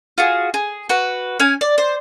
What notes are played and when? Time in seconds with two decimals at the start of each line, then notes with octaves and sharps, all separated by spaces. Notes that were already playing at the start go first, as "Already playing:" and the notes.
0.18 F4 F#4 G#4
0.54 G#4
0.89 F#4 B4
1.40 C#4 G#5
1.61 D5
1.78 C5